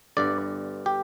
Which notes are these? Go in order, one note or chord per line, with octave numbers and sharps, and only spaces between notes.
G1 G2 D3 D5
G4